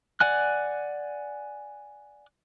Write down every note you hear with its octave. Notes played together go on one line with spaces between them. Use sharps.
D5 F#5 G#5 F#6